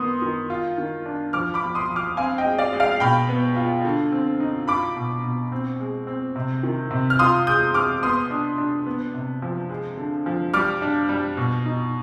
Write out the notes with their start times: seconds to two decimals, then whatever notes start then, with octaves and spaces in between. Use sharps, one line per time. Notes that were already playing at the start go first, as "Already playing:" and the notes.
Already playing: D#3 B3 C6 D#6
0.22 D#3
0.50 F4
0.78 D#3
1.06 D4
1.33 F3 D6 F6
1.54 B5 D6
1.62 F3
1.75 C6 D#6
1.89 F3
1.96 D6 F6
2.17 C4 F5 G#5
2.38 D#5 G5
2.45 G#3
2.59 D5 F5
2.73 G#3
2.80 D5 F5
3.00 B2 G5 B5
3.29 B3
3.56 F4
3.85 D3
4.12 C4
4.40 D#4
4.68 F4 B5 D6
4.96 B2
5.24 B2
5.52 C4
5.80 G#3
6.07 C4
6.36 C3
6.63 D#3
6.91 C3
7.10 F6
7.19 F4 C6 D#6
7.47 G#3 D#6 G6
7.74 G#3 D6 F6
8.03 B3 C6 D#6
8.30 D4
8.58 D4
8.86 B3
9.14 C3
9.42 F3
9.69 G#3
9.97 D3
10.26 F3
10.54 G3 D6 F6
10.82 D4
11.09 G3
11.37 B2
11.66 D#4